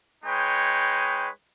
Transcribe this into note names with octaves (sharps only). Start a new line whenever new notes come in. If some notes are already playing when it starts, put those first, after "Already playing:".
G#3 D#4 B4 C#5 G5